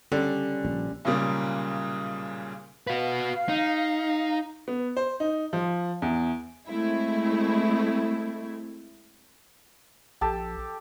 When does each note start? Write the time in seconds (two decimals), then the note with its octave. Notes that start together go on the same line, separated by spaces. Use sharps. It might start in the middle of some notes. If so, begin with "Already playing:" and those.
0.12 D3 G3 C#4
0.65 A#1
1.05 B1 A#2 C#3 G3 A#3
2.87 F#4 B4 F5
3.49 D#4
4.68 B3
4.97 C5
5.20 D#4
5.53 F3
6.02 E2
6.69 G#3 A3 C4 E4
10.21 A#1 G4 A4 A5